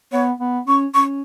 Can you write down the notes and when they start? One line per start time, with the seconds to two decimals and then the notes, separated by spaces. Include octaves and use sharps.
0.12 B3 C#5
0.40 B3
0.67 C#4 C#6
0.94 C#4 C#6